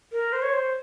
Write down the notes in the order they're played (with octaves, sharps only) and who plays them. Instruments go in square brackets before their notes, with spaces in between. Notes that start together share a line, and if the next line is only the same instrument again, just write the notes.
[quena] A#4
C5
C#5
C5